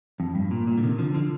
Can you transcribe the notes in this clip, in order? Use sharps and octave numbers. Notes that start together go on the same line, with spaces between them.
F2
G2
A#2
A#2
D3
C3 D#3
D3 F3
D3 F3